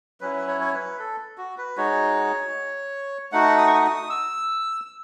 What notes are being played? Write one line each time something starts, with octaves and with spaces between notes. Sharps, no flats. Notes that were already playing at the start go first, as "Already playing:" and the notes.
F#3 C#4 E4 B4
B4
C#5
C#5
B4
A4
F#4
B4
G#3 D#4 F#4 C#5
A3 D#4 F#4 F#5
D#6
C#6
D#6
D#6
E6